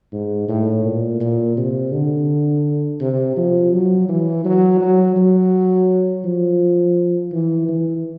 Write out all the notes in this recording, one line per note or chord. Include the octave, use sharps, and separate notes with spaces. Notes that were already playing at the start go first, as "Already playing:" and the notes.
G#2
A2
A#2
A#2
C3
D3
C3
F3
F#3
E3
F#3
F#3
F#3
F3
E3
E3